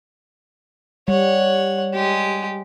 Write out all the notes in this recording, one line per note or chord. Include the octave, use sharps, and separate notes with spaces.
G3 C#5 F#5
G#3 G4